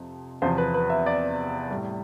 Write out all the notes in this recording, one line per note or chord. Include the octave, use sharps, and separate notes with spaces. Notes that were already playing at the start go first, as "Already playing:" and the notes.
Already playing: F2 C3 F3
E2 C3 F3 C5
B4
B4
E5
D5
A2 G3